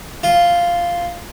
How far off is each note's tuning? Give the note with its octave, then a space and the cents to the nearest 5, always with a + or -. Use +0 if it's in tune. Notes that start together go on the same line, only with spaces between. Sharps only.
F4 -5